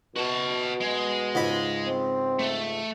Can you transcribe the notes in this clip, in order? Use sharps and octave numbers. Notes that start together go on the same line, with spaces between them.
B2 F#4 A5
G#3
C#2 G#2 B5
C4
A3